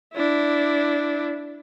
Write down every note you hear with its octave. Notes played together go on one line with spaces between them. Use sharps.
D4 E4